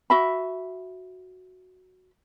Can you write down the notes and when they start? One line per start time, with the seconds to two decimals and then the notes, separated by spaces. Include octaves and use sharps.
0.10 F#4 E5 B5